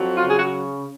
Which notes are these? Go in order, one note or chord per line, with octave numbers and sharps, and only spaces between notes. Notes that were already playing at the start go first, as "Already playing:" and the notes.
Already playing: F2 F#3
F4
C#3
G#4
F#4